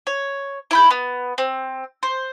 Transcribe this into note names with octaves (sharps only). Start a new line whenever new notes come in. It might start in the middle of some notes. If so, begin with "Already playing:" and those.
C#5
E4 B5 G6
B3
C4
C5